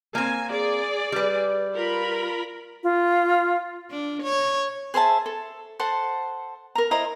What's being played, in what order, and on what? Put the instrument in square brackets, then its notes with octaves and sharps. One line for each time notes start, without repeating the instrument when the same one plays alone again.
[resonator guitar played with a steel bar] A#3 C4 [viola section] G#5
[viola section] G#4 D5
[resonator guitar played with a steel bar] G3 B4
[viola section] F4 A#4 B5
[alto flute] F4
[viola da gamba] D4
C#5
[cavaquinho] G#4 C5 E5 A5
A4
A4 C5 F#5 A5
A#4 A#5
E4 C5 D#5 A#5